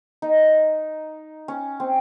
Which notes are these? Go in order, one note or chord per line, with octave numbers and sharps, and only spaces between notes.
D#4
C#4
C4